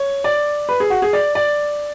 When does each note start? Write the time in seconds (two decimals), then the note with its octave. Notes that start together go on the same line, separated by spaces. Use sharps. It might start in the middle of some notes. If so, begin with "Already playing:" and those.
Already playing: C#5
0.24 D5
0.69 B4
0.80 G#4
0.90 F#4
1.02 G#4
1.13 D5
1.35 D5